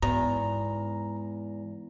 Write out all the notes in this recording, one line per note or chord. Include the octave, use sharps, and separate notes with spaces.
E2 G#2 A#5